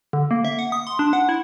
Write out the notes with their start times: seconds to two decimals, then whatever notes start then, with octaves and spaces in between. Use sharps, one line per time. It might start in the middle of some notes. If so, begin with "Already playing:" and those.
0.13 D3
0.31 A#3
0.45 E5
0.59 F#5
0.72 D#6
0.87 C6
0.99 D4
1.13 F#5
1.29 E4